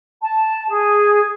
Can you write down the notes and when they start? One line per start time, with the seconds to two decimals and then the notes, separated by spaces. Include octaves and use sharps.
0.22 A5
0.69 G#4